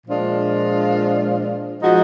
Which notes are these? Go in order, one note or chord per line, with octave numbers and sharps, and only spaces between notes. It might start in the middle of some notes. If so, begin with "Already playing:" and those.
A#2 F3 G#3 D4 F4
F3 G#3 D#4 F#4